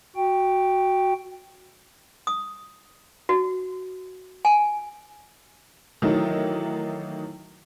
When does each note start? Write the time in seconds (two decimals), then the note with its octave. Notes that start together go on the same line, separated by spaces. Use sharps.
0.16 F#4 G5
2.27 D#6
3.29 F#4
4.45 G#5
6.02 D#3 E3 F#3 A3 D#4